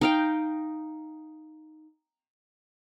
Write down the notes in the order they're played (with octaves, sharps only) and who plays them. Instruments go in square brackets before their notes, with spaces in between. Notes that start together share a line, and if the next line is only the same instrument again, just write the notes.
[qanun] D#4 F5 G5